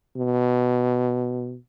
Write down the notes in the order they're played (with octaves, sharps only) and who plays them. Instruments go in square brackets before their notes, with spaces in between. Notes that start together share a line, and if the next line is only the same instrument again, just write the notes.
[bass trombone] B2